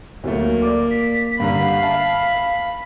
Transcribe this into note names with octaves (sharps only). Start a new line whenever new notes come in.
D2 F#3 A3 A#3
D5 D6
B6
G2 D3 F5 A#5 B5
E5 A5